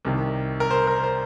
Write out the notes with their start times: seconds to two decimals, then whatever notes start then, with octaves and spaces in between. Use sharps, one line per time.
0.05 C2 C3 D#3
0.60 A#4
0.71 C5
0.87 A#4
1.03 C5